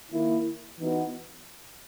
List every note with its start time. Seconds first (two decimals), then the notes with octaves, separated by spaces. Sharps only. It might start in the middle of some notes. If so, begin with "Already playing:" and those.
0.11 D#3 A#3 E4
0.78 E3 B3 D#4 F#4